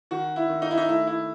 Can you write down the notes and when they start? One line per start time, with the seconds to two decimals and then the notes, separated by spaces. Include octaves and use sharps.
0.11 D#3 F#4
0.36 E4
0.49 D#3
0.62 D#4
0.71 E4
0.78 D#4
0.88 A3 E4
1.07 E4